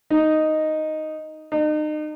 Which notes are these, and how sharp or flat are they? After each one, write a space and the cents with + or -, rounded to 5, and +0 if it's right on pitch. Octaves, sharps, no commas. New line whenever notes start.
D#4 +0
D#4 -35